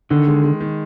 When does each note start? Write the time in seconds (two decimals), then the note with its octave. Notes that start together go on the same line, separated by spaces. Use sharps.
0.10 D3 D#3
0.27 G#3
0.44 G#3
0.61 D#3